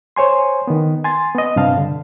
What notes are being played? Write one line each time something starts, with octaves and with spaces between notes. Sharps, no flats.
C5 C#5 G#5 C6
D#3 B3
G#5 C6 A6
B3 D#5
G2 C3 G3 F5 A5
D3